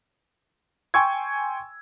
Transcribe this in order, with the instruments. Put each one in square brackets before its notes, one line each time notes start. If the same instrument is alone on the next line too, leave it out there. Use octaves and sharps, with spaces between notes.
[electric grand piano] G5 G#5 C6 C#6 E6 G#6